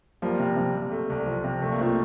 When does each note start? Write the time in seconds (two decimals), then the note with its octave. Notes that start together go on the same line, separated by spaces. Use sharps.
0.22 F3 G3 A#3
0.39 C3
0.57 C3
0.75 C3
0.91 A3
1.10 C2
1.26 F3
1.44 C3
1.62 C2 A3
1.72 A#3
1.79 C3 F3 A3